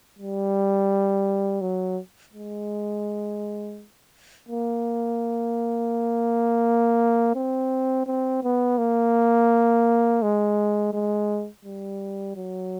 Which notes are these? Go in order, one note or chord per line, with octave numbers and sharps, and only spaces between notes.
G3
F#3
G#3
A#3
C4
C4
B3
A#3
G#3
G#3
G3
F#3